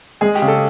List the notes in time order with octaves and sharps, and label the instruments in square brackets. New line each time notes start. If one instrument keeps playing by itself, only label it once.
[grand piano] G#3 [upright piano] G#4
[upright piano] G4
[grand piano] C#3
[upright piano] A4